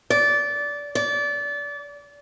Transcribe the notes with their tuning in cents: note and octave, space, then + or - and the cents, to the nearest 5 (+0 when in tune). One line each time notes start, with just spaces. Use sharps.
D5 -20
D5 -25